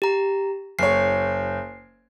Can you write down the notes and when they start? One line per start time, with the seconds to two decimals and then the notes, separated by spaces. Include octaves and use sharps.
0.02 G4 A#5
0.79 F#1 C#5 C7